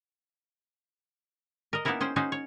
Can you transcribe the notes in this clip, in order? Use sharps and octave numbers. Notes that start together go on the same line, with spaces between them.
A#4 D#5
A#3 B3 C#4 D#4 E4 A#4
C#4 G#4 C5 G5
C#4 D#4 F#4 G#4 C5
C#5